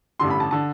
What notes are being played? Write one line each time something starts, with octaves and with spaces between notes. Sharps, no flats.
A1 G2 D3 C6
B5
A5
D3 A5